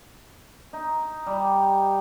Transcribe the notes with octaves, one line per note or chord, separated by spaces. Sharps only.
D#4
G3